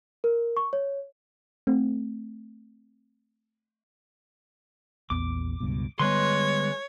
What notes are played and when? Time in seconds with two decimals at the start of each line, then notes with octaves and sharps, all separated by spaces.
0.24 A#4
0.57 C#6
0.73 C#5
1.67 A3 C4
5.10 A#1 E2 B3 D6
5.60 C#2 G2 B2
5.99 D3 G3 G#3 B3 B4 C#5 C6